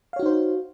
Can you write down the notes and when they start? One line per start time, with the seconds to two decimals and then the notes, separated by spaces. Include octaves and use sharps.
0.13 F5
0.16 C#5
0.19 F#4
0.23 D#4
0.26 C5